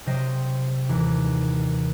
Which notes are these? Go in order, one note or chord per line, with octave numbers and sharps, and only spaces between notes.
C3 F#3 C5 D#5 G5
D#2 E3